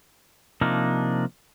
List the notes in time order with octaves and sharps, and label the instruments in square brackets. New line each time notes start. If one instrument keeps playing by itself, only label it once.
[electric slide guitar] C3 F3 A#3 D4 D#4